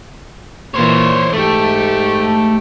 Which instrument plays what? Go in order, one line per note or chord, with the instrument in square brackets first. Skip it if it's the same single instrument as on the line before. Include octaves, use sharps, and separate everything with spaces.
[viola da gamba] A#2 E3 [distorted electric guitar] C5 C#5
[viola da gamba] G#2 G4 [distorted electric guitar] A3